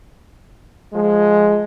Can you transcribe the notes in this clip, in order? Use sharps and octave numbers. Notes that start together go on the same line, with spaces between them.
F3 G#3